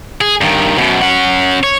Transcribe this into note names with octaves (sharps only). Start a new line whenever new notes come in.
G#4
G2 D#3
F#2 B2
C#4 F#5
C#5